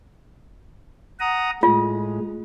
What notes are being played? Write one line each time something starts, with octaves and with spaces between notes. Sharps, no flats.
F#5 A#5 D#6
A2 G#3 F4